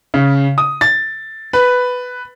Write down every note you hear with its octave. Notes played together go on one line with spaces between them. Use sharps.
C#3
D#6
A6
B4